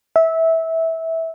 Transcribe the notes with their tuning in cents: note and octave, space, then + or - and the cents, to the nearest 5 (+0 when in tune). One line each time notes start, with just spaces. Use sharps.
E5 -20